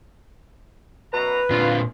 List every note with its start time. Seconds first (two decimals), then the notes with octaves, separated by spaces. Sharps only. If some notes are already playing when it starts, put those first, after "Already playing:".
1.13 F#2 B2 B4 A#5
1.50 A#2 C4 D4 F4